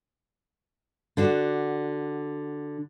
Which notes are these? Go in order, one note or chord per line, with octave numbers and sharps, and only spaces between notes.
D3 D4 F#4